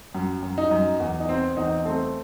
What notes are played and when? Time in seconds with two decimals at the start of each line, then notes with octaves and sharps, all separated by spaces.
0.15 F#2
0.43 F#2
0.58 D#4
0.71 F#2
1.00 E2
1.20 D#4
1.29 C4
1.57 E2 D#4
1.85 A3 C4